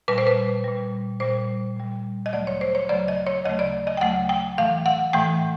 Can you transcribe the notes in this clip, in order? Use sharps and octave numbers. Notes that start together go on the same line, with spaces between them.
A#2 G3 B4
C5
B4
A#2 G3
A#2 G3 C5
A#2 G3
D#5
D2 C#3 F#3 A3 D5
C#5
C5
C#5
D2 C#3 F#3 A3 D5
D#5
C#5
D2 C#3 F#3 A3 D#5
D5
D#5
G5
D2 C#3 F#3 A3 F#5
G5
A2 E3 A3 F5
F#5
A2 E3 A3 G5